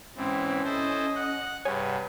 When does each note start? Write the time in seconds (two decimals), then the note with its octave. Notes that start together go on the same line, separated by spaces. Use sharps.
0.17 G#2 E3 C4 C#4
0.64 E4 A4 C5 D#5
1.16 F#5 F#6
1.65 G2 C3 G#4 B4 C#5 F#5 G#5